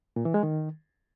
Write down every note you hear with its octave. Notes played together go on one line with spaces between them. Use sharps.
A#2
E3
G#3
D#3